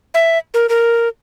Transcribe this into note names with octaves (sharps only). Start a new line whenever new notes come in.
E5
A#4
A#4